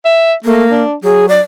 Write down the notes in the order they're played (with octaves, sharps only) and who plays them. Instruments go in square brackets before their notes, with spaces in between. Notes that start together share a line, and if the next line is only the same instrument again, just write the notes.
[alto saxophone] E5
[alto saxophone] A3 [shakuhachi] A#3
[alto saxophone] D4
[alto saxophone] F#3 [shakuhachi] G#4
[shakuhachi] D5